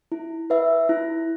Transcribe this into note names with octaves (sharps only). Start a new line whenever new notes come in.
E4
B4 E5
E4